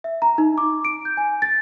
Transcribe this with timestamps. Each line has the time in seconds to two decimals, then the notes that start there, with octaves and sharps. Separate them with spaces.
0.04 E5
0.22 A#5
0.38 D#4
0.58 D6
0.85 D7
1.05 G6
1.17 G#5
1.42 A6